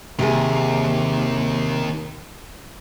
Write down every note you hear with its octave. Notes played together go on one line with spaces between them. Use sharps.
D#2 C3 G#4